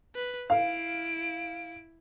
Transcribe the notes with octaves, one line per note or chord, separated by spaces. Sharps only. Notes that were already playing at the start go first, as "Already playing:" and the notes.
B4
E4 F5 D7